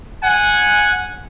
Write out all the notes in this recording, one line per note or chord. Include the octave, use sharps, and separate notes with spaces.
F#5 G#5